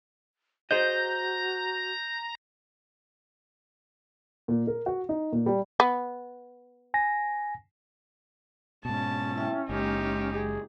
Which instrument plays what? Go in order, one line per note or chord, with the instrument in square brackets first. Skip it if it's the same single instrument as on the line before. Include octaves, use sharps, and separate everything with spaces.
[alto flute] F#4 [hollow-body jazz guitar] G#4 C5 D#5 [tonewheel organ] A#5 [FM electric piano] G6
[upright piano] A#2
A#4
F#4
D#4
A#2
G3
[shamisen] B3
[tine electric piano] G#5 A#6
[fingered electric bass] G#2 B2 [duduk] C#4 [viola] A5
[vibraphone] E4 E5 G5
[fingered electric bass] F#1 [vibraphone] G#3 [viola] D#4 G4
[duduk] G#4